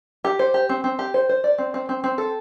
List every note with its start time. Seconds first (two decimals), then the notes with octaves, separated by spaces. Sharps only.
0.24 G4
0.39 C5
0.54 G4
0.69 C4
0.84 C4
0.99 G4
1.14 C5
1.29 C5
1.44 D5
1.58 C4
1.74 C4
1.89 C4
2.04 C4
2.18 A4